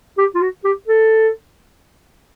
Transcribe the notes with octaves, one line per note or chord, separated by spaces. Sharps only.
G4
F4
F#4
G4
A4